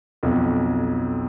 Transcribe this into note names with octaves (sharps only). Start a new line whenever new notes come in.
B1 F2